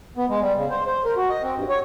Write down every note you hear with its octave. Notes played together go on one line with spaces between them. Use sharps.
B3
G#3
G3
C#3
C5
C5
A#4
F#4
D#5
C4
G2
C#5